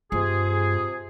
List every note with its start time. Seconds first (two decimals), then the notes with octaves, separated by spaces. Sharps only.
0.12 G2 C3 F4 G#4